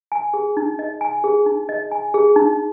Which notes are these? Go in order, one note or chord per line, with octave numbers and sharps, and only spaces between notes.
G#5
G#4
D#4
D#5
G#5
G#4
D#4
D#5
G#5
G#4
D#4